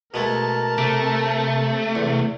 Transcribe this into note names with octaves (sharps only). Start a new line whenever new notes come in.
B2 G#3 A3 A#4 A5
C3 A3 D6
E2